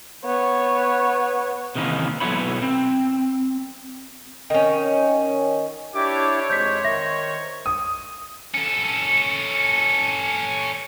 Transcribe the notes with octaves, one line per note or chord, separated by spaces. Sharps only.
B3 C#5
C3 D#3 E3 A#3 C#4
B1 F#3 B3 E4 C#5 B5
C4
D#3 C#4
D4 E4 G4 C#5 D6
F2 G#3 C5 G6 B6
D#3 E5 A#6
D#6
C#4 A4